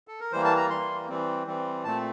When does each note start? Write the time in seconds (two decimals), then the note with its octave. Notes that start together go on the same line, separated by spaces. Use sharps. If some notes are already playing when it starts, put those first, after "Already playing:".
0.08 A4
0.20 A#4
0.32 E3 G3 A#3 C5
0.44 A5
0.57 A#5
0.70 E3 G3 A#3 C6
1.08 E3 G3 C4
1.47 E3 G3 C4
1.84 A#2 A3 C4 A5